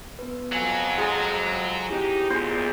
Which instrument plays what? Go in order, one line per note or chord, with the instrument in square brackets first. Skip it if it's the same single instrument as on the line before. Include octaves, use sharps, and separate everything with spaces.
[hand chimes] B3 B4
[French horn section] F2 [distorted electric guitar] F#3 [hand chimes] F5 G#5 E6
[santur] G#3 [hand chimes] F#5 A#5
[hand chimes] C4 E4 [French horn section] D#4 G4
[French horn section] D2 A#2 [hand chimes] B3 F4 G#4 [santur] C5